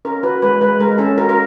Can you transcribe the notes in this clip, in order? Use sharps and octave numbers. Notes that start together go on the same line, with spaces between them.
C#4 A#4
F#4 B4
G#3 B4
G#3 B4
G#3 A#4
C#4 A4
F#4 A#4
A#4